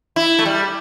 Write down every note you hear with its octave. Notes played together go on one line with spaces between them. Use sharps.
E4
A3
G3